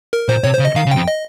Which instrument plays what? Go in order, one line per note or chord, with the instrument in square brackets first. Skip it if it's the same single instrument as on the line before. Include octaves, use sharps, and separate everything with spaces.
[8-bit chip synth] A#4
[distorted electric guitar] A#2 [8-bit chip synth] C5
[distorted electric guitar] C3 [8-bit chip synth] C#5
[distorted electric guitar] C#3 [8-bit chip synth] C5
[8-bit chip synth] D#5
[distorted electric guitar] D#3 [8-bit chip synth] F5
[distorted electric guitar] C#3
[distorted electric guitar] F2 [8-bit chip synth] G5
[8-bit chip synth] D#5